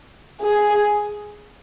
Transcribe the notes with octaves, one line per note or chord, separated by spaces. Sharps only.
G#4